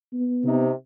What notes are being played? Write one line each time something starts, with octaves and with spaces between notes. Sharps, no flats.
B3
C3 D#4